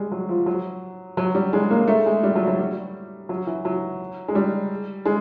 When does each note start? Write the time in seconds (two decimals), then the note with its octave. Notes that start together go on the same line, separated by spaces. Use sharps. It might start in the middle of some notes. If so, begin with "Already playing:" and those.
Already playing: G3 G#3
0.12 F#3
0.29 F3
0.46 F#3
1.17 F#3
1.35 G3
1.53 G#3
1.71 A#3
1.87 A3
2.06 G#3
2.23 G3
2.36 F#3
2.47 F#3
2.58 G3
3.29 F#3
3.47 E3
3.65 F#3
4.28 G#3
4.35 G3
5.06 G#3